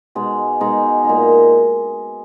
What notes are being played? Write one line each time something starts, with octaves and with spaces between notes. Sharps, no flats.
B2 G#3 D#4
B2 G#3 D#4
A#2 G#3 D#4